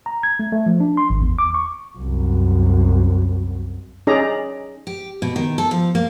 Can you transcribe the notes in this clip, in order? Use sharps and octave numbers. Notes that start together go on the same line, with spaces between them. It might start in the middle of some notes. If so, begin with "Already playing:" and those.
A#5
G#6
A3
A3
F3
D4
C6
G#1
E2
D6
C#6
C2 F#2
C#4 D#4 G#4 D5 A#5
G4
B2
D#3
A4
F3
A#3